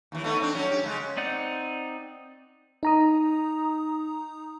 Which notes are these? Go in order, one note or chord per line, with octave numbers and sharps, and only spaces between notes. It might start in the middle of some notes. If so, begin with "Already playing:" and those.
D#2 E3
A3 B3 D#4
C4 D4
F#3 C#4
G4
C#3 G#3
C4 D#4 D5 F#5 G6
D#4 A#5 D#6